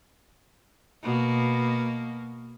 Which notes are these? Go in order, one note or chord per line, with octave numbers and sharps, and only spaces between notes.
B2 A#3